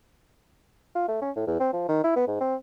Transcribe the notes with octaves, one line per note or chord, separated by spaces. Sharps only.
F4
A3
C#4
A2
E2
C4
F3
D#3
E4
B3
G#2
C4